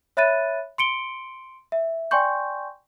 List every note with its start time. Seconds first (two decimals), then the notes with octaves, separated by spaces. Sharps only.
0.17 C#5 E5 B5 F#6 A6 D#7
0.78 C6 C#7 D7 G7
1.72 E5
2.11 D5 G5 G#5 C6 C#6 G6